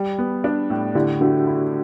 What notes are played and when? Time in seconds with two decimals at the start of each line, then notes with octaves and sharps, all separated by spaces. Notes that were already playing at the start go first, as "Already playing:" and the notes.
Already playing: G3
0.19 B3
0.44 D4
0.70 A2
0.95 D3 E4 G4
1.21 A3 D4 F#4
1.47 E4